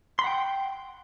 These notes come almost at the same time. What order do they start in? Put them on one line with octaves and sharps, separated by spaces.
C6 B5 F#5 G5